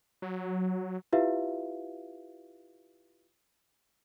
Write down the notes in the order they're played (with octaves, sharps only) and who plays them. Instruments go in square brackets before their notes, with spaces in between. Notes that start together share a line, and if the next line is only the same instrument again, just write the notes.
[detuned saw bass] F#3
[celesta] E4 F4 G4 B4 E5 F5